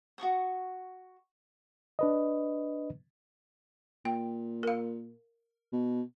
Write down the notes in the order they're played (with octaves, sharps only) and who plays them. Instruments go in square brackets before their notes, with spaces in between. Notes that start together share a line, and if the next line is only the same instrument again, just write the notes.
[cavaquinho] F#4 A4 C#6 D#6
[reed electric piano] D4 B4 D#5
[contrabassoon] A#2 [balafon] G5
[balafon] A#4 F5
[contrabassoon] B2